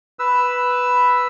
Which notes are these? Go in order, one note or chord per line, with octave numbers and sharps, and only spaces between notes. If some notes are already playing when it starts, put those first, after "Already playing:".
B4 E6